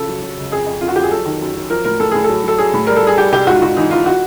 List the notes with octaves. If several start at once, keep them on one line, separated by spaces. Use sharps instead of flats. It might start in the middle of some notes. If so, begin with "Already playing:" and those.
Already playing: C#3 F3 A4
F#3
F#3
C#2
F2 G#4
F2
F2 F4
F#4
F2 G4
G#4
F#3 A4
D#3
F#2
F#3
F3 A#4
A2 A#4
A2 A4
A2 G#4
F#3 A4
F#3 A4
F#3 G#4
A2
G3 A#4
A4
G3 G#4
G3 G4
C2 G4
G#2 F#4
F4
G#2 F#4
E3 D#4
E3 F4
F#4